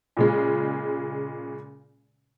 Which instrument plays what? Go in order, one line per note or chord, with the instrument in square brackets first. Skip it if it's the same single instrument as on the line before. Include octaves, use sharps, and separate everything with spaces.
[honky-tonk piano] A#2 C#3 G#3